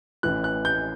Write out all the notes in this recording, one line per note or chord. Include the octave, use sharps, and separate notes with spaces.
A1 A2 E3 F#6
F#6
G6